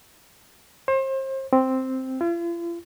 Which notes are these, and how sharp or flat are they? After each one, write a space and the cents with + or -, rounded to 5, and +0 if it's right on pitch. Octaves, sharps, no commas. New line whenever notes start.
C5 +35
C4 +0
F4 -45